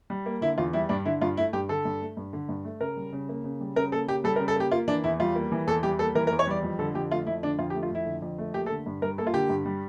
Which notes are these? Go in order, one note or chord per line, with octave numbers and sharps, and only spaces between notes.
G3
A#3
D3 E4
E2 F4
G3 E4
G2 D4
D3 E4
G2 F4
A3 E4
G2 G4
D3 A4
G2
A3
G2
D3
G2
A3
C#3 A#4
G3
C#3
A#3
C#3
G3
C#3 A#4
A#3 A4
C#3 G4
G3 A4
A#4
C#3
A4
A#3 G4
A#3 F4
E3 D4
E2 E4
G3 F4
A#3
E3
E2 A4
G3 G4
A#3 A4
E3 A#4
A#4
E2
C#5
G3 D5
F2
D3 A4
F2 G4
A3 F4
F2 E4
D3 D4
F2 F4
G4
A3
F4
F2 E4
D3
F2
A3
A#3 G4
A4
D3
G2
G3 A#4
A#3 A4
F4
D3 G4
G2
G3